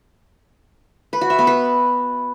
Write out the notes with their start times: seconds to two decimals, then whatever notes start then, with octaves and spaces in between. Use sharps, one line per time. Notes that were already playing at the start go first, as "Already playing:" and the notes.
1.13 B4
1.21 F#4
1.30 E5
1.39 B3
1.47 B4